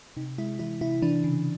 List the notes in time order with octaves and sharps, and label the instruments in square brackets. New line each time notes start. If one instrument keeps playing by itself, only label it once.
[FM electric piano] C3 D#4
G#3 E4
E3 E4
C3 E4
E3 D4
C#3